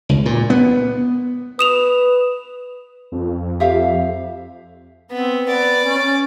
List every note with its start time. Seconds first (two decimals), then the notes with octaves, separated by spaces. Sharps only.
0.09 C#2
0.26 A#2
0.50 B3
1.59 B4 D#6 E7 F7
3.12 F2
3.60 G4 E5 F5
5.11 B3 C4
5.49 B4 D5
5.84 C#4